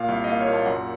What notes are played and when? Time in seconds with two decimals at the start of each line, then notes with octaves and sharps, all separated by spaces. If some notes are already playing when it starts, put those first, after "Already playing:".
Already playing: A#2 F5
0.08 C2
0.24 D#5
0.28 A#3 F5
0.41 C#5
0.47 A#2
0.53 A5
0.66 F#2 F#5